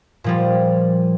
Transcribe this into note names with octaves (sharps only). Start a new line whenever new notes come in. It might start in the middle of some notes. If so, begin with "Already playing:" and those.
A#2 F3 G3